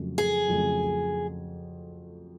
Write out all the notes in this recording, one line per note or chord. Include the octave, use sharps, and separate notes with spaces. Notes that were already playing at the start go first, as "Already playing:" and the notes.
Already playing: F2 C#3 F#3 A3
G#4
F2 C#3 F#3 A3